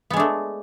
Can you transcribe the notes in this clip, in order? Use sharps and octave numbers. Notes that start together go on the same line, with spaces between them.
G#3 A3 B3 D4